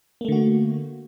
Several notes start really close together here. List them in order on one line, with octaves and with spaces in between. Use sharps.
A#3 A3 D3 F#4